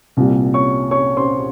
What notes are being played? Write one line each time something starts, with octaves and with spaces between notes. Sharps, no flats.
C2 A#2 G3
C#5 C#6
C#5 C#6
C5 C6